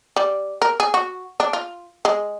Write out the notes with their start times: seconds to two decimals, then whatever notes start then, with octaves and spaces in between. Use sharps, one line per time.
0.16 G3
0.62 A#4
0.80 G#4
0.94 F#4
1.40 D4
1.53 F4
2.05 G#3